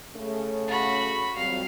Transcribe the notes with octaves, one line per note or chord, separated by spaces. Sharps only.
C#3 A3
F#4 B5
F2 F#3 G3 F5